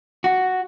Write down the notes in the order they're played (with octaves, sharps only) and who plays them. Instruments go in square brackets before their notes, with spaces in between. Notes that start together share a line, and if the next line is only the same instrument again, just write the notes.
[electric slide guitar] F#4